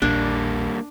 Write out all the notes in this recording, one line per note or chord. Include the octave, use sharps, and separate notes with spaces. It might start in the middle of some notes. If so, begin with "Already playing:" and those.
A#1 E2 G3 A#3 D4 G#5